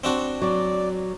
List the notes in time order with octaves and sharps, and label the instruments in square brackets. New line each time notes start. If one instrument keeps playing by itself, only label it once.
[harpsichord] C4 D4 F#4
[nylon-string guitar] F#3 [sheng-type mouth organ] D5